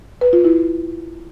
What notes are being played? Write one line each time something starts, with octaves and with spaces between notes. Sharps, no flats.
B4
F4
E4